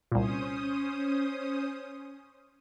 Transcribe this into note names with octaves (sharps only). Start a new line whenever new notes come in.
C2 A#2 C#4 C5 D#6